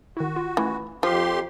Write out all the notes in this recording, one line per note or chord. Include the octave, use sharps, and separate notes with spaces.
D#3 E4 F#4
F4
E3 A3 C#4 F4
F2 F3 G4 C6